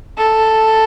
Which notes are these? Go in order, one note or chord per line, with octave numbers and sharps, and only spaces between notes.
A4